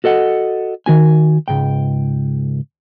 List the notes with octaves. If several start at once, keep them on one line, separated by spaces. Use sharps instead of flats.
F#4 A4 D#5 F#5
D#3 F#4 G#5
C#2 G#2 G5